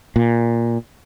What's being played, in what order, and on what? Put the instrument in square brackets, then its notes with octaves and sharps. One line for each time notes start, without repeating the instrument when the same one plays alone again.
[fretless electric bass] A#2